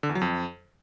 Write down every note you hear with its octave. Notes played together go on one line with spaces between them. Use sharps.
D3
E2
F#3
F2